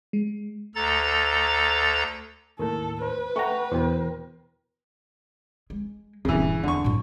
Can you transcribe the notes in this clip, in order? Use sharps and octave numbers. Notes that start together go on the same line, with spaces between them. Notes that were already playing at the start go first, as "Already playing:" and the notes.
G#3
D2 A4 A#5 A6
D#2 A2 A4 A#4
B4 C5
A3 F#5 G5 A#5 C#6
E2 B2 C5 G5
G#3
D#1 G2 C#3 E3
E2 D3 C#6
F#2 A2